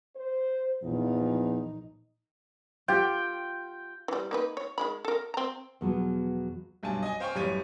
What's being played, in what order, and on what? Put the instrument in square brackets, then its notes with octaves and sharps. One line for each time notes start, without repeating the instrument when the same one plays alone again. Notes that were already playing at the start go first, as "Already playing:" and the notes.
[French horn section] C5
[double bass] A#1 D#4 [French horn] E2 [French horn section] F3
[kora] F4 G4 [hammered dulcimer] G5
[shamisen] E3 G3
A#3 D#4 B4
C#5
D#3 G#3 B5
A4 A#4
C4 A#5
[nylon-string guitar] E2 B2 F3 F#3 B3
[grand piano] B1 G2 G#5 A5
D#5 G#5
C5 F5 G5 G#5 C6 C#6
A1 F#2 G3 C#5 G#6 D#7